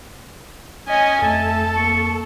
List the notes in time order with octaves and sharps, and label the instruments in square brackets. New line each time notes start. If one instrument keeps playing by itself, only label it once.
[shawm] C#4 [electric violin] D#5 G#5
[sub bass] F2 [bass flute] A3 [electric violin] A4 [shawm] A5
[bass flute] A#3 [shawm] C#6